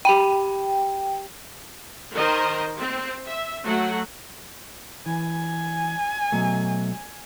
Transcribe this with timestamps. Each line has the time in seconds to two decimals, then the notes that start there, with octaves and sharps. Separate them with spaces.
0.05 G4 G5 B5 D#7
2.14 D#3 A#4 C5 D#5
2.78 C4
3.26 E5
3.64 F#3 A3 F#5
5.06 E3 G#5
6.32 B2 F#3 A3